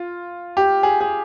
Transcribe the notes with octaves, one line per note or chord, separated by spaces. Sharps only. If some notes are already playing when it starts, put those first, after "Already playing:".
Already playing: F4
G4
G#4
G#4